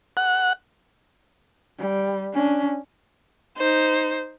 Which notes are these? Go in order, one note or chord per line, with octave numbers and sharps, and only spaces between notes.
F#5
G3
C#4 D4
D#4 C5